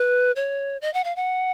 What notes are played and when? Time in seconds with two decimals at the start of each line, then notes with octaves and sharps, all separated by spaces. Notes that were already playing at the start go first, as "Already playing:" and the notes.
Already playing: B4
0.36 C#5
0.82 D#5
0.94 F#5
1.04 F5
1.16 F#5